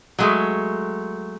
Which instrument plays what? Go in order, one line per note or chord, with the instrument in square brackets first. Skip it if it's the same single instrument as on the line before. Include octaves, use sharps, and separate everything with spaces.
[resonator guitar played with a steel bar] F#3 G#3 A3